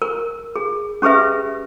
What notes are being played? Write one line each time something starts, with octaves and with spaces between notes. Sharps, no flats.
A#4
G#4
C#4 G4 G#4 B4 E5